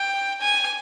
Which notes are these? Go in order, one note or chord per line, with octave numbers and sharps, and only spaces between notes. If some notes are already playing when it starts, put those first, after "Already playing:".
Already playing: G5
G#5